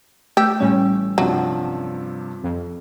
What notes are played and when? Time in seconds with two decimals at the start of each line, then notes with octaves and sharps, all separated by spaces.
0.37 A3 G4 E6 G6
0.60 A1 G3 C#4
1.18 G2 C3 F3 F#3
2.44 F2